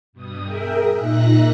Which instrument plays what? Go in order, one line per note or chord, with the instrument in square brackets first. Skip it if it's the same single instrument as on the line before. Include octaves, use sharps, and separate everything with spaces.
[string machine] G2 B2 D#6
G#4 A#4 E5 G5
A#2 D#4 E5 F#6 A#6